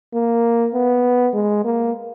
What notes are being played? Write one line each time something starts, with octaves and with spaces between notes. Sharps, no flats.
A#3
B3
G#3
A#3